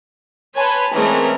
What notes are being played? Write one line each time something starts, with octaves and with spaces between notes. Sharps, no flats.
B4 C#5 G#5 A5 B5 C6
E3 G#3 A3 C4 C#4 A#4